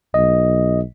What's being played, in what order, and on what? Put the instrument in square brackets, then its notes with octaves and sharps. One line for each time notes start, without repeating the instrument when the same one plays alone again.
[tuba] B1 [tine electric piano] D#5